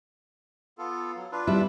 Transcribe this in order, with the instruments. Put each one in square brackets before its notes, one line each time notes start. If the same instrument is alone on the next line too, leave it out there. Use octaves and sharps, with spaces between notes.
[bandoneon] B3 F4 A4
F#3
D4 F4 B4
[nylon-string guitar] G3 C4 E4